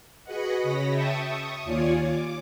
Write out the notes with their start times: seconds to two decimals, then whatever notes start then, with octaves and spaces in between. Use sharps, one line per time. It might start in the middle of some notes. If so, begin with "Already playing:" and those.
0.24 F#4 G#4 B4 D#5 F#5
0.61 C#3 C#5 B5 A#6
0.89 E5 G5 A5 C#6 D#6
1.25 C#6 D#6
1.64 D#2 F4 C#5 D5 G#5
2.04 D6